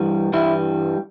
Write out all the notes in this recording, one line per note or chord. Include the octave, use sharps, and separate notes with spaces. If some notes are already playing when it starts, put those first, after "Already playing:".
Already playing: G2 E3 G3
G2 E3 G3 E4